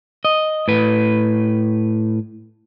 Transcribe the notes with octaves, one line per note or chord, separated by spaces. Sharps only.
D#5
A2 B4